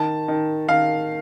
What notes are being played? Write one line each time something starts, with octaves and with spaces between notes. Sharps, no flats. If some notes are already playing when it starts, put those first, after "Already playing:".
Already playing: D#3 A5
D#3
D#3 F5